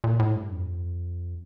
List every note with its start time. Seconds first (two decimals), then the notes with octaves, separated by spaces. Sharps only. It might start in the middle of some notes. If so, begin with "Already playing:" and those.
0.04 A#2
0.19 A2
0.36 G2
0.52 F2